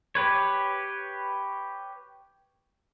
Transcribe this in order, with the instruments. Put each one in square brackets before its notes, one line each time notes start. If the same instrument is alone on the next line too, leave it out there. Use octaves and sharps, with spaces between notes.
[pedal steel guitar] G4 B4 C#5